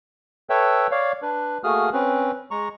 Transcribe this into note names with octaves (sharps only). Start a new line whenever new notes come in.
A4 B4 C#5 E5 G5
C#5 D5 F5
D4 B4
A3 A#3 F#4 G#4 D#6 F6
C4 C#4 B4
G#3 A#5 C#6